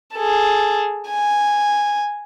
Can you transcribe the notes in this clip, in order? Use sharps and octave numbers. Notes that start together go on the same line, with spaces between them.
G#4 A4
G#5